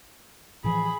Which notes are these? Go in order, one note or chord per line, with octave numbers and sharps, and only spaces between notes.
A2 E3 F3 G#4 B5